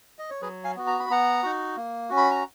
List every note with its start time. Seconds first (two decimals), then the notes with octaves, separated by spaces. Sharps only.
0.19 D#5
0.30 C#5
0.42 F#3 G#4 B4
0.64 F5 G#5
0.76 B3 F#4
0.87 A#5
0.99 B5
1.09 B3 F#5 A#5
1.43 D#4 F#4
1.76 A#3
2.10 C#4 F#4
2.17 B5
2.31 A#5